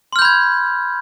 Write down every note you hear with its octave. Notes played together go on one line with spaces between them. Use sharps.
B5 C6 F6 G6 G#6